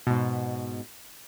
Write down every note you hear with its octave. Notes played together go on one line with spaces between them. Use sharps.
G#2 B2